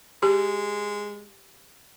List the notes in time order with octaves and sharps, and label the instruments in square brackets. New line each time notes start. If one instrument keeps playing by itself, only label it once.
[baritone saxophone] G#3 [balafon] G4